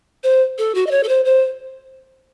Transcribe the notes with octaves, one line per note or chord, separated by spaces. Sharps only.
C5
A4
F#4
D#5
C#5
A4
C5
C5